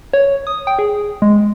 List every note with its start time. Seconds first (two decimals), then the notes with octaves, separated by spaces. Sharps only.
0.13 C#5
0.47 D#6
0.67 G5
0.79 G#4
1.22 G#3